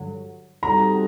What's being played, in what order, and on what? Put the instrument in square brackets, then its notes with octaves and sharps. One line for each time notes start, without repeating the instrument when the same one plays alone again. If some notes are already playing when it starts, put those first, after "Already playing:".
Already playing: [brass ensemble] G2 D3 F#3
[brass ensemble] G3 C4 D#4 F#4 A4 [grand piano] A#5